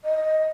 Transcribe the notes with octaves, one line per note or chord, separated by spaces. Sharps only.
D#5